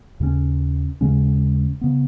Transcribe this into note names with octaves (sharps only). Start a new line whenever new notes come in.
D#2 C#3 G#3 C#4
D#2 C#3 G#3 C#4
C#3 B3